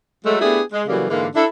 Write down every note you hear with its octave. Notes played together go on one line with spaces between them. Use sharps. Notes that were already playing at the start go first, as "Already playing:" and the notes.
F#3 G#3 A3
A3 B3 D4 E4 G4 G#4
G#3
C#3 E3 F#3 G3 A3 A#3
G#2 D3 E3 G#3 A#3
D4 E4 A4